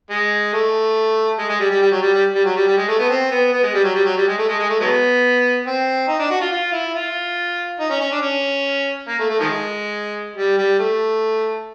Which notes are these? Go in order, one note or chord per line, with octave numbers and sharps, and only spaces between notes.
G#3
A3
G#3
G#3
G3
G3
G3
F#3
G3
G3
G3
F#3
G3
G3
G#3
A3
B3
C4
B3
B3
G#3
G3
F#3
G3
F#3
G3
G#3
A3
G#3
G#3
A3
F#3 G#3 B3
C4
D#4
D4
F#4
F4
F4
E4
F4
D#4
C#4
C#4
D4
C#4
A#3
A3
A3
D#3 F3 G#3
G3
G3
A3